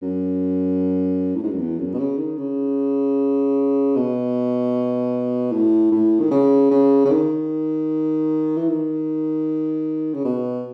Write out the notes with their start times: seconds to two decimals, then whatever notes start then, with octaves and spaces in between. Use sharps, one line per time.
0.02 F#2
1.36 A2
1.43 G#2
1.51 F#2
1.59 E2
1.79 F#2
1.94 B2
1.99 C#3
2.18 D#3
2.38 C#3
3.96 B2
5.52 A2
5.92 A2
6.20 D#3
6.31 C#3
6.71 C#3
7.05 C#3
7.11 D#3
8.57 E3
8.68 D#3
10.14 C#3
10.25 B2